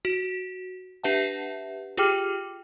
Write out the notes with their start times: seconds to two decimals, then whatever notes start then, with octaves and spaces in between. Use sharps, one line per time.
0.05 F#4
1.04 D4 G4 B4 E5 F#5 A5
1.97 F4 G4 G#4 G5 D6 F6